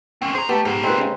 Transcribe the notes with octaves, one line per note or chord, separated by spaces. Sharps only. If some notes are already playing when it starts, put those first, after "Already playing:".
C4 C#4
G#4 C5 A#5
A3 B3 G4
G#2 B3 D#4
A#2 G#3 C4 B4
C#3 G#3